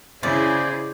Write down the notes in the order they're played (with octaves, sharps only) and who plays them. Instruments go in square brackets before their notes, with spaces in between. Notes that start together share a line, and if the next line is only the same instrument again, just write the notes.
[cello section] C#3 E4 G#4 [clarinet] C5 [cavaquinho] D5